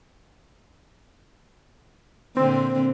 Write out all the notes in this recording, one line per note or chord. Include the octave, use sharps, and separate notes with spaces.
A#2 D3 C4